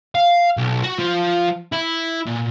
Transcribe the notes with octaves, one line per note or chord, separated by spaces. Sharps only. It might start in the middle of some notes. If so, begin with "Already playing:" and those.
F5
B1
F#4
F3
E4
A#2